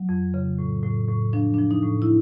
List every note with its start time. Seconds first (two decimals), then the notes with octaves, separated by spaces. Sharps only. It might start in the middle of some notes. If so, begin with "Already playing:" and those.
Already playing: F#3
0.09 F2
0.34 C#3
0.59 A2
0.83 A2
1.09 A2
1.33 F3 D4
1.54 D4
1.59 F3
1.71 D#4
1.83 A2
2.02 E4